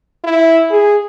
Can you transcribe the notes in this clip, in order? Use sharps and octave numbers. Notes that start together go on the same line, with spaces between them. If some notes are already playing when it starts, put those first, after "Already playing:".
E4
G#4